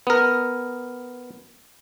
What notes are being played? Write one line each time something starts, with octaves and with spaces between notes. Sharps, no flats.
B3 A#4